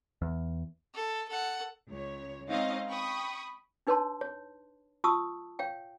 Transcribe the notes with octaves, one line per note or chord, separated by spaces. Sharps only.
E2
A4
A4 F#5
C#2 C#5
G#3 C4 C#4 D#4 D#5 F5
G5 B5 C#6 D#6
D4 D#4 B4 C#5 A5 C6
C#5
F4 A5 C#6 D#6 E6
C#5 F5 G5